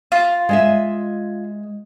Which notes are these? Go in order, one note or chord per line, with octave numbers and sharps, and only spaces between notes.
F4
G#3 D#5 E5